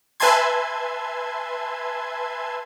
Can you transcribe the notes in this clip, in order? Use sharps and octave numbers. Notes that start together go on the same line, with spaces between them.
B4 E5 G#5 A5 C6 G#6